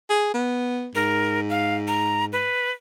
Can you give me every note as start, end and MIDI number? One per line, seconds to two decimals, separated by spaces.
0.10 0.29 68
0.34 0.89 59
0.95 2.49 44
0.95 1.40 70
1.50 1.75 77
1.88 2.25 82
2.33 2.70 71